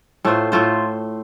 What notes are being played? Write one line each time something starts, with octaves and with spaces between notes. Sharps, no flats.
A2 A3 F4 C5
A2 A3 F4 C5